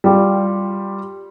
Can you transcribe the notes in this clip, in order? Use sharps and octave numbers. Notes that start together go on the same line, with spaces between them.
G3 F4 G4